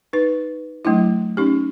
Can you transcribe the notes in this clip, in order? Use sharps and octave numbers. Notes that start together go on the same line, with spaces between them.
D#4 B4
F#3 A3 D4 E4
C#4 D#4 G4